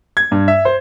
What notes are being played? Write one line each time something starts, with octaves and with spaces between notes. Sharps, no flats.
G#6
G2
E5
C5